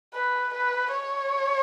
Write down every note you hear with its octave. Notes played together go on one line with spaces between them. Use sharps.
B4
B4
C#5